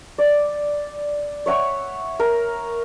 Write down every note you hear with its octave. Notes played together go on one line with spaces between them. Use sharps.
D5
C#5 E5 F#5 C#6
A#4